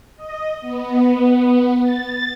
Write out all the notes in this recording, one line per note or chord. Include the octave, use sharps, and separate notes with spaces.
D#5
B3
A6